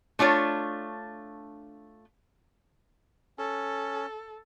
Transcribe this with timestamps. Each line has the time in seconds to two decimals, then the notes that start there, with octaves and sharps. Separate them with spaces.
0.19 A3 D4 F4 C#5
3.38 C#4 A4